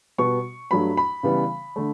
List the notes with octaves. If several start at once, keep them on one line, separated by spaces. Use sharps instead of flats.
B2 G3 B3 C#6
G2 F#3 A3 B5
B5
C#3 E3 G3 B3
D3 A3